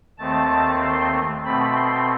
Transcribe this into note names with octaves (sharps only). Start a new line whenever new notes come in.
D#2 D#3 A3 C4 A5
C6
B2 A3 C4 B5
C6